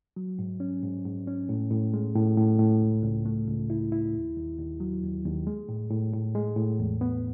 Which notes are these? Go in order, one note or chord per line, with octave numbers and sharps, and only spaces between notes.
F#3
G#2
C#4
G#2
G#2
C#4
A2
A2
G#3
A2
A2
A2
C#2
C#2
A3
C#2
E4
E4
D#2
D#2
D#2
F#3
D#2
D#2
G#3
A2
A2
A2
G#3
A2
E2
B3